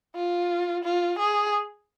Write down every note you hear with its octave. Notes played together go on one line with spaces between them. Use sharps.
F4
F4
G#4